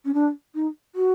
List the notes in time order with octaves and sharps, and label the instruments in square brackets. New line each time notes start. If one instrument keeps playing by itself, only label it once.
[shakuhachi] C#4
D4
D#4
F#4